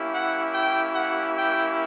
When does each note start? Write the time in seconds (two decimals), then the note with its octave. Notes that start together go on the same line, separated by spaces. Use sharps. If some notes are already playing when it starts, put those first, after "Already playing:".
Already playing: A#3 C#4 E4 G4
0.12 F#5
0.54 G5
0.95 F#5
1.37 G5